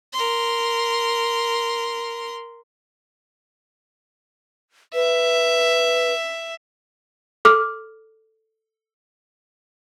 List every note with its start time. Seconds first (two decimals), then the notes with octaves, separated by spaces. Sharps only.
0.13 A#4 C6
4.94 B4 E5
7.45 A4 D6 F6